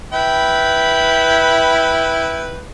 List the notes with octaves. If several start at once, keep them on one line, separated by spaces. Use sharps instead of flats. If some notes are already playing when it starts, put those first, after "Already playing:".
E4 B4 G5